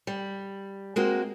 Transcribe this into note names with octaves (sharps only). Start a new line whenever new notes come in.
G3
G#3 A#3 C4 F#4